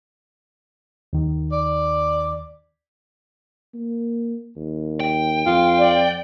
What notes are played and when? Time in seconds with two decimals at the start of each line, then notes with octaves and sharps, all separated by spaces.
1.13 D#2 D#3
1.52 D5
3.74 A#3
4.56 D#2
5.00 G5
5.46 F2 F4
5.78 D5